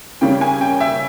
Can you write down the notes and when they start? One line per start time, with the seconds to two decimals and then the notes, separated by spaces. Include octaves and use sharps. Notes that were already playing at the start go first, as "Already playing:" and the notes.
0.21 C#3 G3 A#3 C#4 G5
0.41 G#5
0.61 G5
0.80 E5